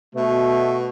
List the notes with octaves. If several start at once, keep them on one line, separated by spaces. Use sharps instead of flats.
B2 A3